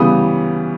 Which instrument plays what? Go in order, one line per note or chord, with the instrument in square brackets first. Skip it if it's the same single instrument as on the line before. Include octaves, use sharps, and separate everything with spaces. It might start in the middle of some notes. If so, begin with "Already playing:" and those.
Already playing: [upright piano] C#3 E3 G3 B3 D#6